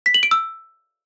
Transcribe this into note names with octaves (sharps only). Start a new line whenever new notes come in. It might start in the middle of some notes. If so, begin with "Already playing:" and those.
B6
F#7
D7
E6